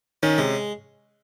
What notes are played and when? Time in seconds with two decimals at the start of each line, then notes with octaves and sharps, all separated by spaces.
0.23 D#3 C#4
0.38 C3 G#3